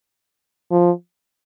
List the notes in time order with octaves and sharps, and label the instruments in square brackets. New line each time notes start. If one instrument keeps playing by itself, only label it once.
[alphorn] F3